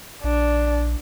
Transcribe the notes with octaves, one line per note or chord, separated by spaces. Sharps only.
A#1 D4